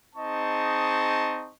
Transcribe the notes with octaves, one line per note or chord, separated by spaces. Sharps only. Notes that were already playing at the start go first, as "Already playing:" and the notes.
C4 D#4 G#4 D#5 A5 C#6